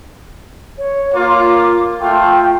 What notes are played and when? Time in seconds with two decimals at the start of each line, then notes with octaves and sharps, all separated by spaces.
0.78 C#5
1.14 A#3 F4 D6
2.00 A3 F4 G5